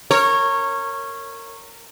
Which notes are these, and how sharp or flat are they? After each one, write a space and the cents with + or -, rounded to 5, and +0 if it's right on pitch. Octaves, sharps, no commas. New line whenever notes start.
A#4 -25 C#5 -10